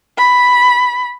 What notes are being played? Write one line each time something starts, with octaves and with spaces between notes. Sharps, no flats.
B5